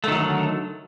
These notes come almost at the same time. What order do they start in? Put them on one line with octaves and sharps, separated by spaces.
A3 D#3 F#3 D3